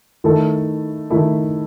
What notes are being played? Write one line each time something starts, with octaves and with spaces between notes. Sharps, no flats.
D#3 A3 E4 A4
D#3 A3 E4 A4